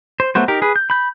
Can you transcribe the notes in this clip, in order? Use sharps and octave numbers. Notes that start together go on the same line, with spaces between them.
C5
F#3 A3 B3 F#4 C5
D#4 G4 A#4
G#4 B4
G6
B5 G6